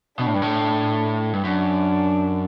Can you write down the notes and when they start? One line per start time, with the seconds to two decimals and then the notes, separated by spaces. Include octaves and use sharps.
0.19 B2 D4
0.27 A2
0.34 G2
0.42 A2
1.33 G2
1.44 F#2 D4